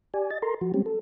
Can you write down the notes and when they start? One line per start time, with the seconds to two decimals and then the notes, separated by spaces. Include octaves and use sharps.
0.14 G4 D5 G#5
0.31 D#5 A6
0.42 A4 A#4 A#5 C6
0.61 F3 F#4
0.74 G3 G#3 C4 C#4 G4
0.86 A4